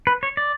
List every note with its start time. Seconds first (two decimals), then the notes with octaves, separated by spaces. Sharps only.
0.07 B4
0.23 C#5
0.37 D5